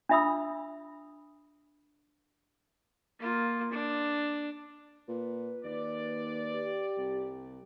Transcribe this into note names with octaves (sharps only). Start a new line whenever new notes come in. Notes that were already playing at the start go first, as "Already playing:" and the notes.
D4 F4 E5 B5 D#6 E6
A#3 F4
D4
A#2 B4
D#2 D5
G4
C2